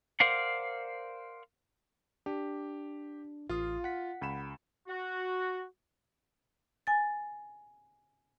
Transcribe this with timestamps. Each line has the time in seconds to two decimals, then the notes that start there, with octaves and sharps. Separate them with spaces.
0.20 A#4 C5 D5 F5 F#5
2.26 D4 G4
3.49 A1 F4 F5 D#6
3.84 F#5 B6
4.22 C#2 B5 E7
4.87 F#4
6.87 G#5 A6